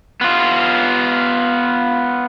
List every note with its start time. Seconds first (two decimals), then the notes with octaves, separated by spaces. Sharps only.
0.21 B3 F4